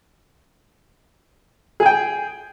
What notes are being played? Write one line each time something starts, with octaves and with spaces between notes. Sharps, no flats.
G#4 G5 G#5